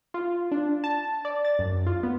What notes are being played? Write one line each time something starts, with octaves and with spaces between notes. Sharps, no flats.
F4
D4
A5
D5
A6
F#2
F4
B3